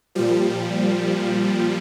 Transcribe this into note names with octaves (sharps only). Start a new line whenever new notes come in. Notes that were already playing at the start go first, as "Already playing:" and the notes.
A#2 F3 G3